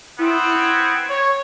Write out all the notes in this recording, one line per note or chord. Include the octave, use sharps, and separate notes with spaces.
B3 C4 E4
G#6
C#5